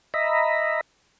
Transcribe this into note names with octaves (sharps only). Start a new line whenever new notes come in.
D#5 E5 A#5 B5